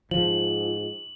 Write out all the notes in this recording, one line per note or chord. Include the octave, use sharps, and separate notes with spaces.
G#2 F3 F#7